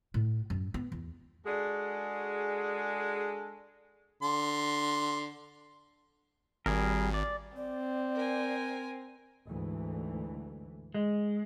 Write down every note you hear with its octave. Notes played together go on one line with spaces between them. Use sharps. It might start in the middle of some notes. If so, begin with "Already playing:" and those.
A2
F#2
B3
E2
G#3 D4 F#4 G#4 A4
D3 C6
G#1 G3 G#4 A#4
D5
C4 D5
A#4 G#5
D2 G#2 E3
G#3